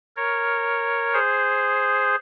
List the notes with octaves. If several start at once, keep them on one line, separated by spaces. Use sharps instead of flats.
A#4 C#5
G#4 C5